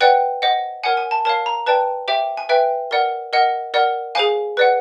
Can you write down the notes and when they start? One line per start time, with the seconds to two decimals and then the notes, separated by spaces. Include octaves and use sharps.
0.01 B4 D5 F#5 G5
0.42 C5 D#5 F#5
0.83 A#4 C#5 F#5 G#5
0.97 G#5
1.11 A5
1.25 A#4 C#5 F5 A5
1.46 A#5
1.66 B4 D5 G5 A5
2.08 G4 C5 E5 G5
2.37 G#5
2.49 B4 E5 G5
2.91 A#4 D5 F#5
3.33 A#4 D#5 F#5
3.74 A#4 D5 F#5
4.15 G#4 C5 F5 G#5
4.57 B4 D5 F#5